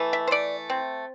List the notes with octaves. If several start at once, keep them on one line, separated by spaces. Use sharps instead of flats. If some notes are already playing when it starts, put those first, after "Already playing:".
Already playing: E3 A3
E5
C5
A3 D5
C4